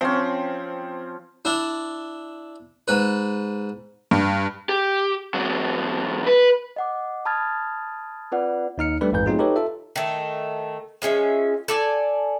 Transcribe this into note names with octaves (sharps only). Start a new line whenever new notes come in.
F3 C4 C#4
D4 E4
G#2 B4
G2
G4
E2 F#3
B4
D#5 F#5 D6
A5 B5 D#6 F6 G#6 A6
C4 F4 B4 D5 F#5
D#2 D#4 F6 C#7
G3 A3 D4 G4 A4 B4
A1 F2 G#2 B4 G6
F#3 A3 C4 D#4 F4 G#4
D#4 G4 A4 B4 C#5
F4 A4 E5
D#3 A3
F3 G#3 C#4 E5
A4 D5 G#5